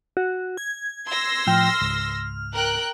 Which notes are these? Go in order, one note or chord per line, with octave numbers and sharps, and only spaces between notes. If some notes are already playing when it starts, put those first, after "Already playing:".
F#4
G#6
C6 E6 A#6
A2 F3 G5 F6
C#2 G#2
A#4 G5 F#6